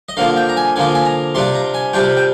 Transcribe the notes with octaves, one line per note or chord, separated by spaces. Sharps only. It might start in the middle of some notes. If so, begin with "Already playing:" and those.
D#5
D3 F3 A#3 F4 F5
G5
A#5
G#5
D3 F3 A#3 F4 G#5
G#5
A#5
C3 G3 D4 F4 C6
A#5
G#5
C3 G3 D4 F4 G5
G5